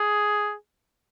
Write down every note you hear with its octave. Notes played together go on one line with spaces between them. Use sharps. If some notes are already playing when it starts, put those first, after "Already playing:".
Already playing: G#4